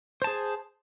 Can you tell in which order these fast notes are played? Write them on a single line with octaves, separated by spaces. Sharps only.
C5 A5 G#4